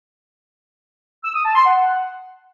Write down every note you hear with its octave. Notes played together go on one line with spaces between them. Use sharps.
E6
D#6
A5
C6
F#5